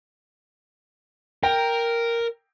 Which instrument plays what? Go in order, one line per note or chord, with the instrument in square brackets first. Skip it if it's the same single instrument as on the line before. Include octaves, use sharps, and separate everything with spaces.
[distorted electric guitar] A#4 [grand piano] G5